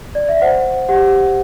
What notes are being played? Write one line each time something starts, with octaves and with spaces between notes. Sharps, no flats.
D5
E5
C5 F#5
G4 F#5